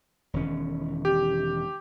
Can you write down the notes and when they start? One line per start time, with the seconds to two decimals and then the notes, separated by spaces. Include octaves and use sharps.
0.34 E1 D#3 C#4
1.05 G4